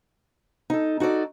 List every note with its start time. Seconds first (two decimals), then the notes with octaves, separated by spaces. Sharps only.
0.70 D#4 A4
1.00 D#4 F#4 A4 D5